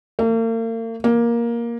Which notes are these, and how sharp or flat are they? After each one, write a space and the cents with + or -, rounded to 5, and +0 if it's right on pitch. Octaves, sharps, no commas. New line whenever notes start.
A#3 -45
A#3 +10